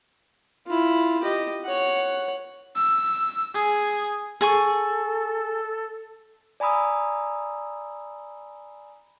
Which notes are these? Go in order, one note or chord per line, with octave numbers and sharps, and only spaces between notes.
E4 F4
G4 D#5
C#5 F#5
E6
G#4
G#4 A4 G#5 C#6
D5 G#5 A#5 B5 D#6 E6